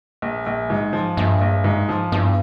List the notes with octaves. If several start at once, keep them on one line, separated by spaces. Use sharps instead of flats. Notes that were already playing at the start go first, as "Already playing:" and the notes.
A#1
A#1
G#2
F3
A#1 G2
A#1
G#2
F3
E2 G2